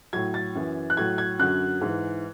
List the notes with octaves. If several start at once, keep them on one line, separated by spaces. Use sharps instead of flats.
A2 F#3 G#6
A6
F#2 E3
F#6
A2 F#3 G#6
G#6
F#2 D3 F#3 F#6
G#2 E3